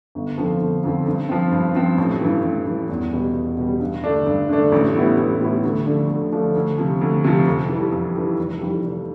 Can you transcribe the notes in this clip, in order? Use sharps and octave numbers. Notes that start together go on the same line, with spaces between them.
G1
F2 D3 F3 C4
G1
F2 D3 F3 C4
G2
F3 C4
G2
F3 C4
A1
G2 E3
A1
G2 E3
E2
B2 G3
E2
B2 G3
G2
D3 A3 D4
G2
D3 A3 D4
A1
A2 G3 B3 E4
A1
A2 G3 B3 E4
D2
D3 F3 A3 D4
D2
D3 F3 A3 D4
D2
C3 F3
D2
C3 F3
F2
E3 G3
F2
E3 G3
F1
F2 E3 G3
F1